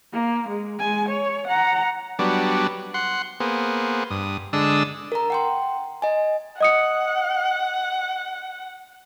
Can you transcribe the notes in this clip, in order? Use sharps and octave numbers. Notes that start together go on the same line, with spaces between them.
A#3
G#3
G#3 G#5
C#5
F#5 A#5
F#3 G3 B3 D4
F#5 C6
A#3 B3 G#4 C5
G2 D#6
D3 G#3 D4 A5 D#6 E6
A#4 A#5
F#5 G5 C6
D#5 G#5
D#5 F#5 D#6 C#7